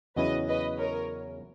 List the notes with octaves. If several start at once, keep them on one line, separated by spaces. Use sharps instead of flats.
E2 C#3 F#3 C#4 E4 B4 D#5
B4 D#5
A#4 C#5